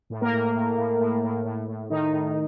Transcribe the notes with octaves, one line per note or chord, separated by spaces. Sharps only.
A2
A#3 A#4
A2
A2
A2
A2
A2
A2
A2
A2 D#3 D#4
A2